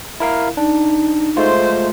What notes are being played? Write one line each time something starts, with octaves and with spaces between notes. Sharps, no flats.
E4 A#4 F5
D4 D#4
G#3 A3 F4 C5